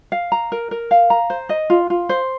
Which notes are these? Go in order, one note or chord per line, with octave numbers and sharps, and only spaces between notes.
F5
A#5
A#4
A#4
F5
A#5
C5
D#5
F4
F4
C5